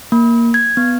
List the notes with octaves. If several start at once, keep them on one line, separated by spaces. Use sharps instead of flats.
A#3
G#6
B3